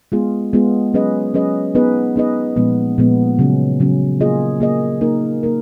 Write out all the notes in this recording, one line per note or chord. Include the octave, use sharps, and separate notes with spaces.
G#3 B3 F4 G#4
G#3 B3 F4 G#4
F#3 C#4 G#4 B4 D#5
F#3 C#4 G#4 B4 D#5
B3 D#4 G#4 B4 D#5
B3 D#4 G#4 B4 D#5
A#2 F3 G#3 B3
A#2 F3 G#3 B3
C#3 F#3 C#4
C#3 F#3 C#4
A#3 F4 G#4 D#5
A#3 F4 G#4 D#5
A#3 D#4 A#4
A#3 D#4 A#4